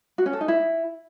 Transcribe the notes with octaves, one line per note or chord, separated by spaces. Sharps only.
F#4
C#4
A4
D#4
E4